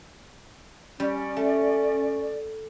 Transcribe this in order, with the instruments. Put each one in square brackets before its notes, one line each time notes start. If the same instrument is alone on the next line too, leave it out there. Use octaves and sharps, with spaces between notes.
[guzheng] G3 [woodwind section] C#4 D5
[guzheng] A3